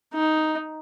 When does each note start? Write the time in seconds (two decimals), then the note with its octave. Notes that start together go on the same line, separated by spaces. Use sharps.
0.14 D#4